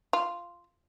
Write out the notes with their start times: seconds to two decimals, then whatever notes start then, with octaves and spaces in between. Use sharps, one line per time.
0.13 F4